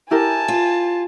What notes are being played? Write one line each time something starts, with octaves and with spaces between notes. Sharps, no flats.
E4 G4 A#4 G#5 A5
F4